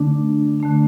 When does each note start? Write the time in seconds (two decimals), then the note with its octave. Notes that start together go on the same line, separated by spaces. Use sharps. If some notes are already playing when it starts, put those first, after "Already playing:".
Already playing: D3 A3 D4
0.60 D3 A3 D4